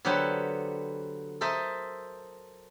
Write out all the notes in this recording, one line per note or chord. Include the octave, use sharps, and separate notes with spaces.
D3 F#3 B3 G4 B4 C5
A4 A#4 C5 D#5 E5